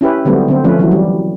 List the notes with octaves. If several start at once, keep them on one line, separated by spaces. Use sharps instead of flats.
C#4 E4 G4 B4
D3 F#3 G3 A3 B3 C4
D3 C4
F3 A3 C#4 B4
E3 F#3
G3